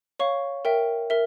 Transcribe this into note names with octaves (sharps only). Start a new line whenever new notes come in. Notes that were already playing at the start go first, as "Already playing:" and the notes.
C#5 F5 C#6
A#4 E5 G5
A#4 E5